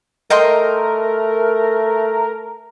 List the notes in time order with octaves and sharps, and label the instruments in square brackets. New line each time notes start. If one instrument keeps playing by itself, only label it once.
[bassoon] A3 [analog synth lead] A#4 [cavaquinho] D#5 G5 C6